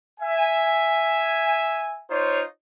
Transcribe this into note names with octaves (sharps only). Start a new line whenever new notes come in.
E5 G#5
D#4 F4 C5 C#5